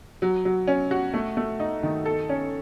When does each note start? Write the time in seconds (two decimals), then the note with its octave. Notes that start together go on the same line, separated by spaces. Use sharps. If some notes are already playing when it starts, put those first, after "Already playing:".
0.22 F#3
0.45 F#3
0.67 C#4
0.91 F#4
1.14 A3
1.37 A3
1.60 D#4
1.83 D#3
2.06 A4
2.29 C#4